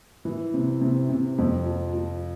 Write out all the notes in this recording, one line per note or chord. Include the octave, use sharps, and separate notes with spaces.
E3
C3
C3
C3
F2
F3
F3